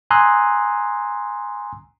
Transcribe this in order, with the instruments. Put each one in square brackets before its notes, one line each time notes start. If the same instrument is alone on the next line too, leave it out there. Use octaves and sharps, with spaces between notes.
[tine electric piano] G#5 A#5 C6 D#6 E6 F#6